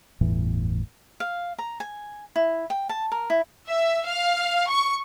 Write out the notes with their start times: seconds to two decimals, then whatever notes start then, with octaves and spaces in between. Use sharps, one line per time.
0.21 G1 E2 A2 E3
1.20 F5
1.58 A#5
1.80 G#5
2.36 E4
2.70 G5
2.89 A5
3.12 A#4
3.30 E4
3.68 E5
4.06 F5
4.69 C#6